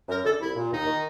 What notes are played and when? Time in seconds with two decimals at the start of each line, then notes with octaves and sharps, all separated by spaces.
0.09 F#2 A#4
0.25 D3 A4
0.40 C2 E4
0.56 A#2
0.72 D#2 D#4
0.87 D#3